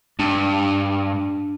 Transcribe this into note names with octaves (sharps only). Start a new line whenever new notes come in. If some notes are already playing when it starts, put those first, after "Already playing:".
G2 D4